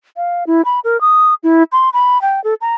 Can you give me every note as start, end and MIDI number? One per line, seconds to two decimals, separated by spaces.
0.17 0.44 77
0.47 0.62 64
0.65 0.80 83
0.84 1.00 70
1.01 1.34 87
1.43 1.63 64
1.72 1.89 84
1.93 2.21 83
2.22 2.43 79
2.44 2.54 69
2.61 2.76 82